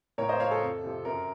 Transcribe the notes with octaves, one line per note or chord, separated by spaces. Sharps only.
A2 A#4 C#5
C5 D#5
F3 C#5 F5
A4
F2
C3 F3
F#2 A#4